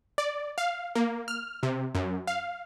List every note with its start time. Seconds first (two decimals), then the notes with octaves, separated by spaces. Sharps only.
0.18 D5
0.58 F5
0.95 A#3
1.28 F6
1.63 C3
1.95 F#2
2.27 F5